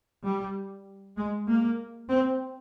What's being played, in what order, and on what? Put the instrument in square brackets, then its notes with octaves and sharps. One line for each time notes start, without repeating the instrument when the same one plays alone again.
[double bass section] G3
G#3
A#3
C4